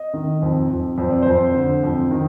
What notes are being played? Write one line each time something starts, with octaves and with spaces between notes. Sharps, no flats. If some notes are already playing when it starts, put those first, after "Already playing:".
Already playing: D#5
D#3
F2
F2
F2 C5
D5
F2 C5
D3
F2
D#3